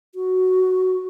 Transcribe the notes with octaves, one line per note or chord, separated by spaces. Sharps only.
F#4